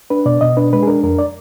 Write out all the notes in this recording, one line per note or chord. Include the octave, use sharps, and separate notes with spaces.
D4 B4
B2 D5
B2 D#5
D4 B4
G#3 B4
G#4
D4 A#4
F2 A#4
D5